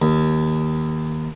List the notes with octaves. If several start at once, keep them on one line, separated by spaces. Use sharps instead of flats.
D#2